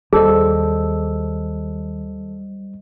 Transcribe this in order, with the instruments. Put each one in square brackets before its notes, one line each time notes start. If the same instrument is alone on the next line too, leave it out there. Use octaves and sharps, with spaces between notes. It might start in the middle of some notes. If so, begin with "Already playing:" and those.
[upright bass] D#2 [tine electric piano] G3 C5 D#5 [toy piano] G#4 [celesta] A4 A5 E6